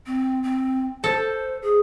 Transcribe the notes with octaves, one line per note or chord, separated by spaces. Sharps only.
C4
C4
A4 C5
G#4